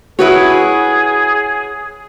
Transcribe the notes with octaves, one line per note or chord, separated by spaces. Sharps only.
E4 F#4 G#4 B4 C#5